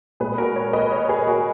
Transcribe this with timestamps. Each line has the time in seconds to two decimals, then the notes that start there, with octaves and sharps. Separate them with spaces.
0.20 A#2 G#3 G#4 B4
0.38 F#4 A#4
0.56 A#4 C#5
0.73 B4 D#5
0.91 A#4 C#5
1.09 G#4 B4
1.27 F#4 A#4